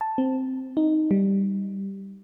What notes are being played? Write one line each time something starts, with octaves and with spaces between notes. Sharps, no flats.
A5
C4
D#4
G3